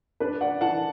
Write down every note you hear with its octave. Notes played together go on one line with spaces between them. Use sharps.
D4 B4 D5
D5 F#5
E3 F#5 A5